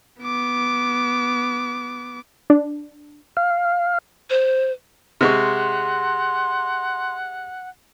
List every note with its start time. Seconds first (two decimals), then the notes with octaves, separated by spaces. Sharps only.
0.21 B3 D6
2.50 D4
3.37 F5
4.30 C5
5.21 C3 G#3 F#5 C6 C#6